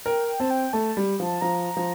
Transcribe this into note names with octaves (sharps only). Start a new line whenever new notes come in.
A#4 G5
G5
C4 A5
G5
A3 A5
G3
F3 A5
F3 A#5
F3